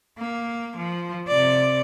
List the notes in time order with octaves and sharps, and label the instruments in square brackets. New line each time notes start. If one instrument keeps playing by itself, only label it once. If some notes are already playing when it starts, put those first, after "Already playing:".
[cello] A#3
F3
C3 D5